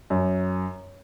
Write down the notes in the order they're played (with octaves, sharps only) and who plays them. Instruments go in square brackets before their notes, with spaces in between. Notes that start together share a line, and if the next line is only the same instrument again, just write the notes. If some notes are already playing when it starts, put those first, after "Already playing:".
[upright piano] F#2